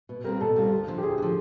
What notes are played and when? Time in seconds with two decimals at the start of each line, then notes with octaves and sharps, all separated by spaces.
0.09 B2
0.24 G3 C4 F4 A#4
0.41 B2 A4
0.56 G3 C4 F4
0.72 D2
0.87 D3 F3
0.98 G4
1.03 D2 G#4
1.18 D3 F3